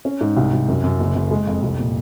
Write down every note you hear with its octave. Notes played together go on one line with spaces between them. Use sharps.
C#4
G#2
C2
C2
F#2
F#2
F#1
F#1
G#3
F2
C2
A#2